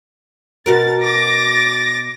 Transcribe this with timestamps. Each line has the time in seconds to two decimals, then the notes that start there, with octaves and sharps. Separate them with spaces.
0.66 B2 F#4 A#4 A6
1.02 D6 A6 A#6